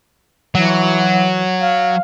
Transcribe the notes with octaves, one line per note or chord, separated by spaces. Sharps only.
E3 F#3
F5